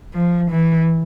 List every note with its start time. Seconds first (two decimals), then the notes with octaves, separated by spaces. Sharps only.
0.14 F3
0.51 E3